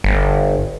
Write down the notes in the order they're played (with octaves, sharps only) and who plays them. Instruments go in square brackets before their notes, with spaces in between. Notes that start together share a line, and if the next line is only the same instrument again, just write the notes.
[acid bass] G1